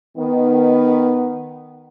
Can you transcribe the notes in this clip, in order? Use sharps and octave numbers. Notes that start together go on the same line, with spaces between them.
D#3 B3